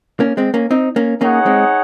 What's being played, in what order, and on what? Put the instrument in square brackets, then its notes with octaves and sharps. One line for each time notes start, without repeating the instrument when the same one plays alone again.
[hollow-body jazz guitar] A#3 C#4
G#3 C4
A#3 C#4
C4 D#4
A#3 C#4
[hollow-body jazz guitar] A#3 C#4 [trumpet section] D#4 G#4 C#5 F#5
[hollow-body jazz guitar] G#3 C4